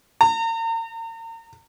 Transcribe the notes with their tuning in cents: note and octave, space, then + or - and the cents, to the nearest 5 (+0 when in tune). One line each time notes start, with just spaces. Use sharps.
A#5 -40